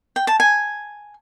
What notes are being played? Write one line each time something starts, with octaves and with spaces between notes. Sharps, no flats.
G5
A5
G#5